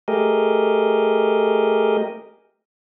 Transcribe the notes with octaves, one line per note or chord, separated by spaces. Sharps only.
A3 G4 G#4 A#4 D#5